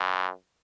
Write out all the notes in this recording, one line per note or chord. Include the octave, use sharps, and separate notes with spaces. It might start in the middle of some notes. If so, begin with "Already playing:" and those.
Already playing: F#2